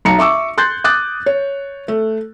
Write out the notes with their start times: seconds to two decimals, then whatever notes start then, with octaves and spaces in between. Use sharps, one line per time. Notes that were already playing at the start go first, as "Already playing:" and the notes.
0.05 B1 A#5 C#7
0.19 E5 C#6 D6 E6
0.58 C6 F#6 G6 A6
0.84 D6 D#6 F#6 A6
1.26 C#5
1.88 A3